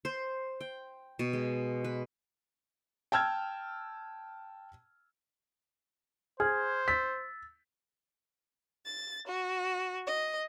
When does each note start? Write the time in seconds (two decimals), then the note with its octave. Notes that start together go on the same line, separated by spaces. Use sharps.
0.05 C5
0.61 G5
1.19 B2
1.33 G#3
1.84 B4
3.12 G5 A5 E6 F6 G#6
6.40 G#4 C5 F6 G#6
6.88 E6 A6 B6
8.86 A6
9.27 F#4
10.07 D#5